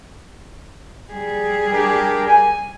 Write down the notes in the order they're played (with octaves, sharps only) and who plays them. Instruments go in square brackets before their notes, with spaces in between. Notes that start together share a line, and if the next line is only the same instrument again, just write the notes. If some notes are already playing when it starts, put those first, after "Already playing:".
[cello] G3 G#4
[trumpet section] D4 G4 A#4
G#5